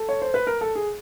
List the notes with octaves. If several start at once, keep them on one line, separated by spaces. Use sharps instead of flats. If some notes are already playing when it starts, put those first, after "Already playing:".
Already playing: A4
C#5
C5
B4
A#4
A4
G#4